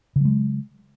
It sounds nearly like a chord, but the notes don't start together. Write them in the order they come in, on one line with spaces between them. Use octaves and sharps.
C#3 F#3 G#3